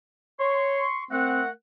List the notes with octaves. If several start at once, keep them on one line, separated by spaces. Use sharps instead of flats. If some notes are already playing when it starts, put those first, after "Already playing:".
C#5 C6 C#6
A3 C4 A#4 F#5